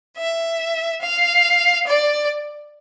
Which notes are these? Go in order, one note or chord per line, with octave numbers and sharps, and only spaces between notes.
E5
F5
D5